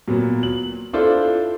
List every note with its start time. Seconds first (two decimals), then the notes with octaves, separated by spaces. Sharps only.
0.08 A#2 F#3 B3
0.43 F#7
0.93 D4 E4 F4 A4 C5